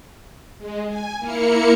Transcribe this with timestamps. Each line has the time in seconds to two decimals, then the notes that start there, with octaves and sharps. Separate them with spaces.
0.58 G#3
0.87 G#5
1.19 A#3 E4 A#4 C#7